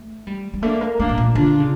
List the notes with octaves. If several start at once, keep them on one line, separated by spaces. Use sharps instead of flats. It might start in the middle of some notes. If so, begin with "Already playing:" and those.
Already playing: A3
G3
G3
A3 A#3 D4
A#3
A3 A#3 D4
A2
A#2
D3 D4 F4
C#3